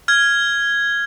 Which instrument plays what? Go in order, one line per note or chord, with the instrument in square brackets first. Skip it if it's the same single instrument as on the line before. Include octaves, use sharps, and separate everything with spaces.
[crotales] F6 G#6